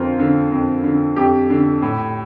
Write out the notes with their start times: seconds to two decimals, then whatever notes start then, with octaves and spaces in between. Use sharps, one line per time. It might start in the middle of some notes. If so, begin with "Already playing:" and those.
Already playing: F2 D3 F4 A#4 C5
0.19 D3
0.52 F2
0.84 D3
1.16 F2 G4
1.50 D3
1.82 A2